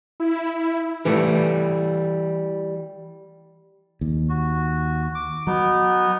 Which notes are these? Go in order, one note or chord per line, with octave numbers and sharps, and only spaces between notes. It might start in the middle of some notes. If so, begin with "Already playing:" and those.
E4
E3 G3 A3
D#2
F#4
D6
F#3 B3 D#4